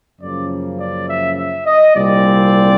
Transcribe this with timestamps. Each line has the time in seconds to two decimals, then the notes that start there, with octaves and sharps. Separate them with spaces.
0.20 F#2 C#3 F3 A#3 D5
0.79 D5
1.07 E5
1.37 E5
1.66 D#5
1.95 C2 A#2 G3 C4 D5